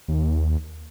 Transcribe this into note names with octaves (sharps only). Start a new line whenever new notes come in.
D#2